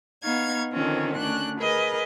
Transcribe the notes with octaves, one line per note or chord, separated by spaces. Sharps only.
B3 D#4 F5 C#6 G#6
D3 D#3 F3 C4 C#4
D2 C#4 D4 F#6
G#4 A#4 B4 D#5